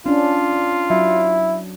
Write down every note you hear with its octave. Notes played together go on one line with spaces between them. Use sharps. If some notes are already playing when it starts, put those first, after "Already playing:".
C#4 D4 F4
F#3 E4